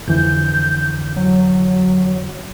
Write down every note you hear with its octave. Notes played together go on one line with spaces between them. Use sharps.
F2 D3 E3 G6
F#3